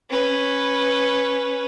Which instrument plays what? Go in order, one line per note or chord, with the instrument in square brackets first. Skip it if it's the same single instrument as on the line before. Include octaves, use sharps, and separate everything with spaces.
[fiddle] C#4 B4